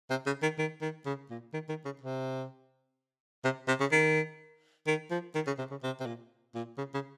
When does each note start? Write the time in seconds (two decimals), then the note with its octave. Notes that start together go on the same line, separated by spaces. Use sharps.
0.10 C3
0.26 C#3
0.42 D#3
0.58 D#3
0.81 D#3
1.05 C#3
1.30 A#2
1.53 D#3
1.69 D#3
1.85 C#3
2.01 C3
3.44 C3
3.68 C3
3.80 C#3
3.92 D#3
4.87 D#3
5.10 F3
5.35 D#3
5.47 C#3
5.58 C3
5.71 C#3
5.83 C3
6.00 C3
6.06 A#2
6.55 A#2
6.78 C#3
6.94 C#3